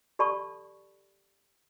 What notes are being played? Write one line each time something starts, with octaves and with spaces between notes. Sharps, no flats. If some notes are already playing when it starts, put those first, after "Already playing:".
G4 A4 D5 A5 B5 C#6